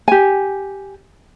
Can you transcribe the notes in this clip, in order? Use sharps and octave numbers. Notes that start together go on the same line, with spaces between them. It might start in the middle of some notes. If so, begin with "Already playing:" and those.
G4 G#5